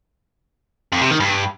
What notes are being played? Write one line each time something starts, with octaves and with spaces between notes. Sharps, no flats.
F2
C3
D#3
G2